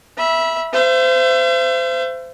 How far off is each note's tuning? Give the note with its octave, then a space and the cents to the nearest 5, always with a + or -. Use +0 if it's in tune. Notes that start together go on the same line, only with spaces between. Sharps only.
E5 +0 B5 -25
C5 -25 E5 +45